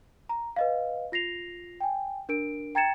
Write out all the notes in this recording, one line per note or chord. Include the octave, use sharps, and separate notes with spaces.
A#5
B4 D#5 F5
F4 A#6 C7 F7
G5 G#5
D4 A#4 D7
G5 A#5 G#6 A6 C#7 E7